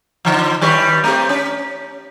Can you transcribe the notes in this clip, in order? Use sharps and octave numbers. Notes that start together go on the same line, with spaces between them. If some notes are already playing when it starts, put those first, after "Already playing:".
D3 F3
D#3 G3 B4
A3 C4 G4
C#4